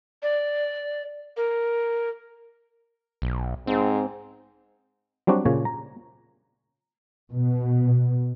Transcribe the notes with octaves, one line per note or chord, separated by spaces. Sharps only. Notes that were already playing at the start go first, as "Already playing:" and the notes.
D5
A#4
B1
G#2 C4
F#3 G3 C4 D4 F#4
A#2 C#3 C#5
A#5
B2